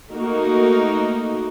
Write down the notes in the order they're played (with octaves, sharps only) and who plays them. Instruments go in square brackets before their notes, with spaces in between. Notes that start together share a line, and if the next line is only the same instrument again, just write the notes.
[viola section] A3 A#3 D#4 F#4 A#4